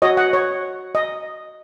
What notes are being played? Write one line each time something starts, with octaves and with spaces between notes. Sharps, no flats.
F#4 C#5 D#5
F#5
C#5
D#5